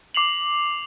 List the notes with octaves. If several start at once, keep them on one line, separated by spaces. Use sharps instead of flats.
D6 C7 F7 F#7